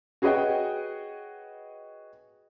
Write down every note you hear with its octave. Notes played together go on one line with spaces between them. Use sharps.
F#4 G#4 B4 C#5 D#5 G5